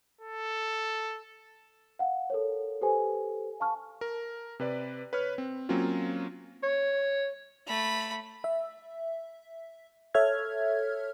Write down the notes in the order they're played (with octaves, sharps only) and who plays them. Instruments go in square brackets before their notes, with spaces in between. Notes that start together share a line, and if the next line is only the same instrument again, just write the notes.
[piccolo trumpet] A4
[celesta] F5 F#5
A4 A#4 C#5
G4 A4 B4 C5 G#5
F5 A5 C#6 F6
[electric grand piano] A#4
C3 B4 D5
B4 C#5 F6
C4
F#3 A#3 C4 C#4 F4
[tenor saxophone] C#5
[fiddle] A3 B5
[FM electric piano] E5
A4 C#5 E5 F6 G#6